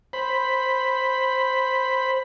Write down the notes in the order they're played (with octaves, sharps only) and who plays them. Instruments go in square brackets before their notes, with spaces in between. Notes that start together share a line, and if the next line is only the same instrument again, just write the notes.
[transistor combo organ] C5 B5